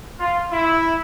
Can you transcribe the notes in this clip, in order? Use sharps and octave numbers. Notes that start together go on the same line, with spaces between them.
F4
E4